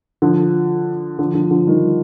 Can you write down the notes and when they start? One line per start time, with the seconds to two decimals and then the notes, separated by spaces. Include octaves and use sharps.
0.22 D3 F3
1.18 D3 F3
1.34 D3 F3
1.51 D3 F3
1.67 D#3 G3